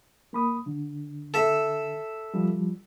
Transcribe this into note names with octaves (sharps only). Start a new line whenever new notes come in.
A#3 B5 D#6
D3
A4 E5
F3 G3